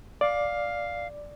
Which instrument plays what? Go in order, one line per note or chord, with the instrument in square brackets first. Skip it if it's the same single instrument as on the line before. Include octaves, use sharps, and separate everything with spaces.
[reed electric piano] D5 [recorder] F5